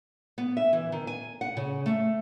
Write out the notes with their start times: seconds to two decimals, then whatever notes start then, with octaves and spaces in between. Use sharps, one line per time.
0.38 B3
0.57 E5
0.73 E3
0.92 D#3
1.07 G#5
1.41 F#5
1.57 C#3
1.86 A3